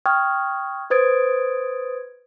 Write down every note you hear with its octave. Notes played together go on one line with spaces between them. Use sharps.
G5 C#6 D#6 F6 G#6
B4 C5 D#6 G#6 A6 D7